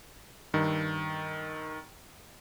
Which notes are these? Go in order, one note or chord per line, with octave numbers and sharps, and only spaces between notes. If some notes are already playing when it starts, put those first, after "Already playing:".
G2 D#3